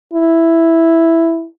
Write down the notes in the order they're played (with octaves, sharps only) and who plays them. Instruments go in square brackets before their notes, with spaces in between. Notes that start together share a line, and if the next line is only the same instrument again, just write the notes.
[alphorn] E4